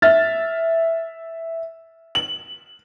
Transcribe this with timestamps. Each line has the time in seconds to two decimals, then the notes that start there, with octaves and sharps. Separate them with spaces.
0.02 E5 F6 A6
2.15 F#7